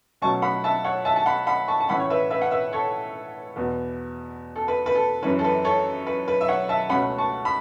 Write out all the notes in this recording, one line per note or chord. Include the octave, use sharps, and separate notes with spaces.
B2 F#3 A3 C#4 A5 C#6
F#5 B5
E5 A5
C#5 F#5
E5 A5
A5
F#5 B5
F#5 B5
A5 C#6
A5
A2 E3 A3 C#4 F#5 B5
C#5
B4 E5
B4 E5
F#5
B4 E5
A4 C#5
E2 B2 B3
A4
B4
B4
A4
F#2 E3 C#4 B4
A4
B4
A4 C#5
B4
B4
E5
C#5 F#5
E5 A5
C#2 B2 A3 C#4 F#5 B5
A5 C#6
B5